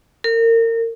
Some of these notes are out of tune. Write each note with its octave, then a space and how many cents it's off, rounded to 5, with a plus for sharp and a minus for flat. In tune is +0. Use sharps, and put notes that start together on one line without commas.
A#4 -30